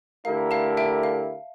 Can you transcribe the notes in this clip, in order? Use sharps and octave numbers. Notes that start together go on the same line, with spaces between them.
D3 A3 E4 G4 A#4 F5
F5 A5
E5 G5
F5